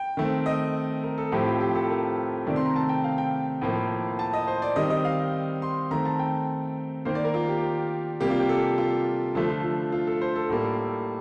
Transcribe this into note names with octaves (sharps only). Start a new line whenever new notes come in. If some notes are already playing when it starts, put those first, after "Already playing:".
Already playing: G5
D#3 A3 C4
D#5
A#4
A4
A2 F3 A3 C4 G4
F4
G4
A4
A#4
C3 D#3 A3 C4 D5
C6
A#5
A5
G5
F5
G5
A2 F3 A#3
A5
D#5
C5
D5
D#3 G3 C4 D#5
D#5
F5
C6
D#3 A3 C4 A#5
A5
G5
D#3 A#3 C5
D5
A#4
F4
G4
C3 G3 A#3 G4
F4
G4
A4
F4
D3 F3 A3 F4
F4
F4
F4
A4
C5
A4
A2 G3 A#3 A4